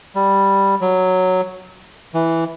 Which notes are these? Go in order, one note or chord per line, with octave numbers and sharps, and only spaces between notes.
G3
F#3
E3